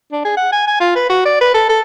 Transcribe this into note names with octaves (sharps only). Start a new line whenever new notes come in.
D4
G#4
F#5
G#5
G#5
F4
B4
F#4
D5
B4
A4
A4